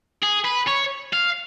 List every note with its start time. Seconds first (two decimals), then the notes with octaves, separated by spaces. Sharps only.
0.23 G#4
0.45 B4
0.67 C#5
1.13 F5